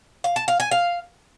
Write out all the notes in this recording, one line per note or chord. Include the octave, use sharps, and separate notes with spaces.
F5
A5
F5
G#5
F5